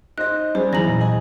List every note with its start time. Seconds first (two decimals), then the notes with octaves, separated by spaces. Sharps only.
0.18 D#4 C5 D#5 F#6
0.55 G3 C#4 D#4 G#4 C5
0.73 E2 E3 F#3 E4 G#5 A#5 A#6 F#7
0.89 A#2
1.01 D#5 G#5